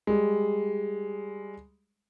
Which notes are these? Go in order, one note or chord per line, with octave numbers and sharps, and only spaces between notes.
G3 G#3